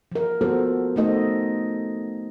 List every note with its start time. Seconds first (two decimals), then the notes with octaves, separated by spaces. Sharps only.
0.12 F3 A#4
0.41 F3 B3 F#4 A4 C5
0.96 A3 B3 D#4 A4 C5 D#5